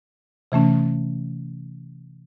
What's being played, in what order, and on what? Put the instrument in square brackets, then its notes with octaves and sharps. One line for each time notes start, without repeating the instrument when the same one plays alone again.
[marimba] C3 E3 A3 C#4